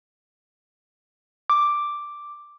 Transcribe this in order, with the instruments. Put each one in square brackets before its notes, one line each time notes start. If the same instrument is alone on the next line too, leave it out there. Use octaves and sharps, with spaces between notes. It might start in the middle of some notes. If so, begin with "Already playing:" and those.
[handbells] D6